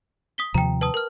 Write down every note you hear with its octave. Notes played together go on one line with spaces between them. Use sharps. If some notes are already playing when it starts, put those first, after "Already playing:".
D#6 B6 G7
D#2 C3 F3 G5 A#5
B4 A5 D#6
A#4 F6